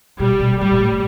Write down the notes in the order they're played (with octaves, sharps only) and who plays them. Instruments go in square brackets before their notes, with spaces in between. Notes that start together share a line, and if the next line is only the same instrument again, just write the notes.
[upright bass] B2 [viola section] G3
[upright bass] B2
[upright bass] A2 [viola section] G3
[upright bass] B2
A2